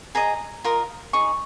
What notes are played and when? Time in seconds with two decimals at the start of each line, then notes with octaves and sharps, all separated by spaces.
0.15 G#4 D#5 A#5
0.64 F4 A#4 D#5
1.13 D#4 G#4 C#6